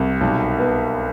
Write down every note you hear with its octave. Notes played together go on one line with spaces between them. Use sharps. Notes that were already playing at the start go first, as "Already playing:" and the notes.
Already playing: C2
B1
B3